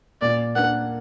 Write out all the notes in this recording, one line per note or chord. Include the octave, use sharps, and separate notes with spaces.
A#2 D5
A#3 D4 A#4 F#5